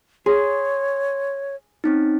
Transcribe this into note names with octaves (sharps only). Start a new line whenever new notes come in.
G#4 C#5 C6
C4 C#4 D#4